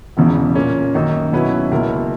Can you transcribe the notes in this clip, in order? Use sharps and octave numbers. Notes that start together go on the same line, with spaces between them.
E1 E2 C#3 E3
A#2 A#3 C#4
F#2 D#3 A#3 D#4
B2 F#3 C#4 E4 B4
C#2 B2 A#3 E4 A#4